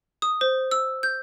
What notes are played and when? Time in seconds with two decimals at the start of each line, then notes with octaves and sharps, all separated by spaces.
0.22 D#6
0.41 C5
0.71 E6
1.03 G6